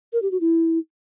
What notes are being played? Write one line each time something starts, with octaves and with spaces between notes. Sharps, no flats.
A#4
G4
F#4
E4